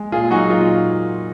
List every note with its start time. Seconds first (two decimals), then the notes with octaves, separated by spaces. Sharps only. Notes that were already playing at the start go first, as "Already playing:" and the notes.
Already playing: G#3
0.12 A#2 F4 G#4
0.26 G#4
0.30 F#3 D#4 F#4
0.50 A#2 F4